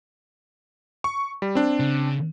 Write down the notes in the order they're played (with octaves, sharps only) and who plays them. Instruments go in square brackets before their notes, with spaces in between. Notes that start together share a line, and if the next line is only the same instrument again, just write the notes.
[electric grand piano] C#6
G3
C4 D4
[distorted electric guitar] C#3